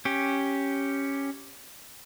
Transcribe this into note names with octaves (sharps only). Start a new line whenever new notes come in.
C#4 G4